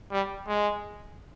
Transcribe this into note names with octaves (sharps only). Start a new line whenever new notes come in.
G3
G#3